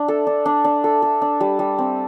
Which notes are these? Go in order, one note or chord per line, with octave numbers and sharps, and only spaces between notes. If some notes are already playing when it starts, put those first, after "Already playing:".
Already playing: D4
A4
D4
D4
D4
A4
A4
D4
G3
G3
C4